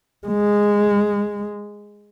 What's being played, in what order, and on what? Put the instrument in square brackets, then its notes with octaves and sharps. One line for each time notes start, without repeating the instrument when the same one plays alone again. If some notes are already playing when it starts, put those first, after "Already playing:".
[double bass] G#3